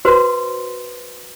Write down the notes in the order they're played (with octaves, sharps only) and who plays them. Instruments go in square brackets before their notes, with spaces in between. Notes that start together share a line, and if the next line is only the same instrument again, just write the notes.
[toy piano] F#4 B4 C5 C6